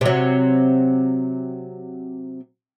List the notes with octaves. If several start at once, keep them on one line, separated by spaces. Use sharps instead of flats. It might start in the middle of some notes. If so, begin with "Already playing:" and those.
C3 F#3